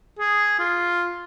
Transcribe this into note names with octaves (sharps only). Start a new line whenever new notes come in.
G#4
F4